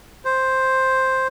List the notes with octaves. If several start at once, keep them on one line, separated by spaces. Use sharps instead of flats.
C5